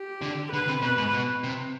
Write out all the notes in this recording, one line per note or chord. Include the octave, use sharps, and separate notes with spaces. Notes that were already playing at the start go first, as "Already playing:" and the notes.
Already playing: G4
D3
D3 B4
C3
B2 B4
G#2
B2
C3